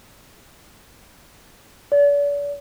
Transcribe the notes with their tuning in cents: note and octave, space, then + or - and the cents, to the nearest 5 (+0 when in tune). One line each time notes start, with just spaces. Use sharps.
D5 -40